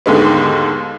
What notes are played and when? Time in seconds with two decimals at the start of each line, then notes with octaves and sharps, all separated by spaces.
0.06 D#2 G#2 D3 G#3 B3